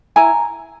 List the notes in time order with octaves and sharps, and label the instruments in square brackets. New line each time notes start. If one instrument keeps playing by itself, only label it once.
[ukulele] E4 G#5 A#5